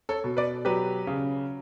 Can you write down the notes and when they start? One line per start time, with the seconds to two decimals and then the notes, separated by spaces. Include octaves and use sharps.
0.09 A4 C#5
0.24 B2
0.37 B4 D5
0.65 F#3 G4 B4
1.07 C#3